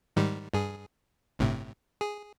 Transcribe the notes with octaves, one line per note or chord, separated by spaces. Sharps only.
G#2 D#3 G3
G2 G#4
G1 A2 C3
G#4